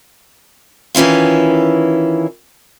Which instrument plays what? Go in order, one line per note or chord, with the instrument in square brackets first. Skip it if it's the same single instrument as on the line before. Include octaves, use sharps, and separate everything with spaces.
[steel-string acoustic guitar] D#3 E3 C#4 E4 F4